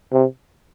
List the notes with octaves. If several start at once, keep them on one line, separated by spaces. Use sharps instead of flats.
C3